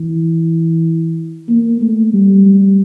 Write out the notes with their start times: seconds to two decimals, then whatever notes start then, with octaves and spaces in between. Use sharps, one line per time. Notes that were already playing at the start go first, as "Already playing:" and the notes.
Already playing: E3
1.48 A#3
1.81 A3
2.14 G3
2.46 G3